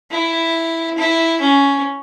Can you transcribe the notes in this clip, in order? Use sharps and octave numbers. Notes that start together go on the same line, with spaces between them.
E4
E4
C#4